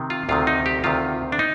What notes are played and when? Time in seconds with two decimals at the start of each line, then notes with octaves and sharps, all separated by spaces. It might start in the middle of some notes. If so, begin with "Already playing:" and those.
Already playing: C3 D#3
0.10 F4
0.29 D2 C3 D#3 F4
0.47 D#4
0.66 G4
0.84 D2 C3 D#3 F4
1.32 D4
1.39 D#4